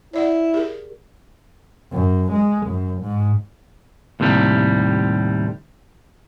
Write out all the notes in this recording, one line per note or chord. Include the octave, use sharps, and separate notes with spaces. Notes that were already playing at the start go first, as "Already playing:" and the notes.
E4 C#5 D5 F#5
G4 G#4 A#4
F#2
G#3
F#2
G#2
D#2 A2 C3 G3